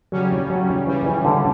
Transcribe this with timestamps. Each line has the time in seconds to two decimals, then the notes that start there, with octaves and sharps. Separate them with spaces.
0.12 C#3 F#3 G3 C#4
0.50 F#3
0.87 C#3 E3 G3 C#4
1.06 E3
1.25 D3